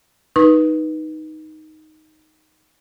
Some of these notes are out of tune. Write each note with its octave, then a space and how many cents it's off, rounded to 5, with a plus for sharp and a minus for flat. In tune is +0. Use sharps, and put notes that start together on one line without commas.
D#4 +0 B4 -15 C#6 -40